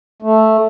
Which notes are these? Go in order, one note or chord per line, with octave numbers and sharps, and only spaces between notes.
A3